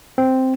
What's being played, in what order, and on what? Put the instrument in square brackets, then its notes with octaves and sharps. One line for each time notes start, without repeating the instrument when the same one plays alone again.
[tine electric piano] C4